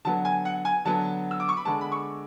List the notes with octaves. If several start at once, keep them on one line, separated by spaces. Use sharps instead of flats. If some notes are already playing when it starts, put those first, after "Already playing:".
D3 F#3 B3 A5
G#5
F#5
G#5
D3 F#3 B3 A5
E6
D6
C#6
B5
D3 G#3 B3 A5
B5
C#6